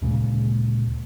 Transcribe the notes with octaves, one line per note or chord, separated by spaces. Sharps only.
D2 A#2 C#3 G#3